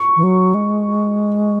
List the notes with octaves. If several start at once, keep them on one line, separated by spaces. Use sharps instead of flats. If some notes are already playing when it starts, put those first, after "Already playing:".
Already playing: C#6
E3
F#3
G#3